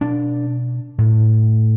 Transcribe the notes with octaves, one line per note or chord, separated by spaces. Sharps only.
B2 D4
A2